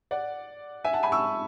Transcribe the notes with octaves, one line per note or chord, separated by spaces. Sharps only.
D5 F#5
E5 G#5
F#5 A5
G#5 B5
C#6 E6